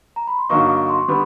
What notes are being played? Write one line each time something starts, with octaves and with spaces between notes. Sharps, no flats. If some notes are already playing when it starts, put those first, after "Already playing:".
A#5
B5
C6
G2 D3 F#3 A#3 D#4 C#6
D6
C6
D3 G3 B3 B5